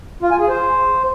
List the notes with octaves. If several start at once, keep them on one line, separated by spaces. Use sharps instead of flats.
F4
G#5
G#4
C5